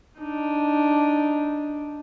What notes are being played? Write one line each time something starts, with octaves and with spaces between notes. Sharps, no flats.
D4 D#4